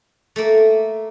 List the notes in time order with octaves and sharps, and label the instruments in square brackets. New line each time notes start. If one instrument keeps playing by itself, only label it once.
[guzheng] A3 A#3